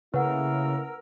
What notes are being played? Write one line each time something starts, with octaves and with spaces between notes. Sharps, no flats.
C#3 A3 A#3 E4 A#4 B4 F#5 E6